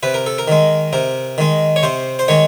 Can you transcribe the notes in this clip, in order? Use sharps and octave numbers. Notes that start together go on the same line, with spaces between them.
C3 B4
A#4
A4
A#4
D#3 G#3
C3 A#4
D#3 G#3
C#5
C3 C5
C5
D#3 G#3 C#5